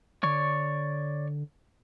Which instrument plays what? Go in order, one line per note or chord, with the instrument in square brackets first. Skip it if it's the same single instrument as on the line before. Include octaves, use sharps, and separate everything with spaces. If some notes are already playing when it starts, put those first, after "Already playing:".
[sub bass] D3 [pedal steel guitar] C#5 D5 C#6